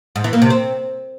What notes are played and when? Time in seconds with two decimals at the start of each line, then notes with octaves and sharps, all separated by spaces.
0.16 G#2
0.24 E3
0.33 A#3
0.42 C3
0.50 C4